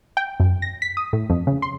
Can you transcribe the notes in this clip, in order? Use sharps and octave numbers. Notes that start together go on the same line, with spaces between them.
G5
F#2
A#6
B6
D#6
A2
F2
C#3
C6